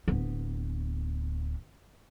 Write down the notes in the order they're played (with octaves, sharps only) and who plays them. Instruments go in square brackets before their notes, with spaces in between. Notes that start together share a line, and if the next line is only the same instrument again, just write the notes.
[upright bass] D1 B3